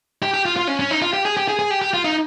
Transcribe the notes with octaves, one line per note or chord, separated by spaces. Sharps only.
G4
G4
F4
F4
C#4
C#4
D#4
F4
G4
G#4
G4
G#4
G#4
G4
G4
F4
D#4